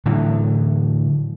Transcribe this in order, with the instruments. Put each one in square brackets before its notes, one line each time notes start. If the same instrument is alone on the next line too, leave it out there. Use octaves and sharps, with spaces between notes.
[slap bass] A2 D3 E3 F#3